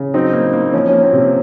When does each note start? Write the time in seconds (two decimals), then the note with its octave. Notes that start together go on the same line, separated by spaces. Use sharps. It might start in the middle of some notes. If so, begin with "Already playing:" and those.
Already playing: C#3
0.14 F#3 C4 D#4
0.33 A#3
0.53 A#3
0.73 F3 C#4
0.88 A#3 C#4
1.03 C4
1.13 C3